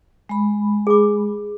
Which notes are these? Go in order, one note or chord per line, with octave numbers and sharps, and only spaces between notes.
G#3 B5
G#4 D6